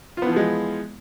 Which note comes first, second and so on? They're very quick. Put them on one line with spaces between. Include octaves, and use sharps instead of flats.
F4 B3 E3 F3 G#3